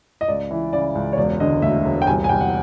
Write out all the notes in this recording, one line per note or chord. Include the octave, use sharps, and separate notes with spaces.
D#5
C#2 D5
E3
C#3 D5
C#2
C#5
E1 D5
D3 D#5
D2 E5
E1
G5
C2 G#5
G#5
C2 G5
F#5